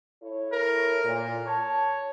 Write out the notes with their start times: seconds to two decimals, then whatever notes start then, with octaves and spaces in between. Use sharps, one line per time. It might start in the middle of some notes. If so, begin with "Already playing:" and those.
0.23 E4 A4 C#5
0.53 A#4
1.05 A#2
1.46 C#5 A5